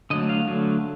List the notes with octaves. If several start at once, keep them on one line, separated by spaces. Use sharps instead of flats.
D3 F#3 A3 D#5
F5
D3 F#3 A3